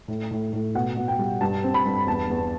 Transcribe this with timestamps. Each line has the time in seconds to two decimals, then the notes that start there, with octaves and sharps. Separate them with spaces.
0.08 A2
0.31 A2
0.53 A2
0.75 B2 F#5
0.97 B2
1.08 G5
1.19 G3
1.41 G2 A5
1.64 C4
1.74 B5
1.85 G2
2.07 E2 A5
2.30 E2